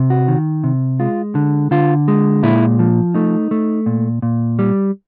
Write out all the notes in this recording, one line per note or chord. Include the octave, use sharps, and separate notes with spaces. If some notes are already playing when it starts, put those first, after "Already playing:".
Already playing: C3
F#4
D#3
C3
G#3 F4
D3
D3 F4
G#3
A#2 E4
F3
A3 D#4
A3
A#2
A#2
G3